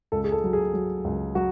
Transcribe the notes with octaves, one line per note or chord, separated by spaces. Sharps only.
C#2 A4
G#4
A4
F#3
G#4
F#3
C#2
F#3 F#4